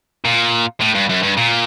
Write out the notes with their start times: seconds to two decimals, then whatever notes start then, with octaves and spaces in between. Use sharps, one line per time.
0.25 A#2
0.81 A2
0.95 G2
1.09 F#2
1.23 G2
1.37 A#2